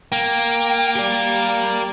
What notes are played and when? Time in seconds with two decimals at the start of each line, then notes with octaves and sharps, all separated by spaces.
0.12 A#3 G5
0.95 G4 D5